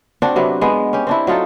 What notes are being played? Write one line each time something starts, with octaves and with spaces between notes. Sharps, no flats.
C4 D4 F#4
C3 F#3 B4
G#3 B3
C#4 G4
C4 D4 E4
F#3 D#4 F4 A4